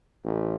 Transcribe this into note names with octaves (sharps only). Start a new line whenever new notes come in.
A1